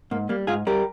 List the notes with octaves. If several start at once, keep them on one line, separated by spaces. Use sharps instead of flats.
G#2 A#3
G3 A#3
G#2 F4 G#4
G3 G4 A#4